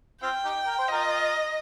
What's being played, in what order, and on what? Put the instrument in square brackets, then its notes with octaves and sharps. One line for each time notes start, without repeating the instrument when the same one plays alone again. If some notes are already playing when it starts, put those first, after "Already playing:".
[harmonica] C4 F4 [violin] G5
[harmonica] D#4 G4
A#4
C5
[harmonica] F4 A#4 [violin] D#5